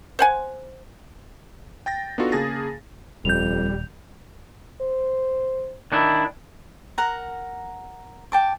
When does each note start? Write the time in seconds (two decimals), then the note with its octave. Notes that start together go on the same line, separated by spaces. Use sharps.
0.19 C5 F#5 G#5
1.86 G5 A6 A#6
2.18 B3 D4 D#4 F4 F#4 A4
2.32 C#3 A#3 G#4 A5 A6 A#6
3.25 D#1 F2 G3 G6 F7
4.81 C5
5.92 D#3 D4 E4
6.98 A#4 F#5 A#5
8.32 G5 A5 D6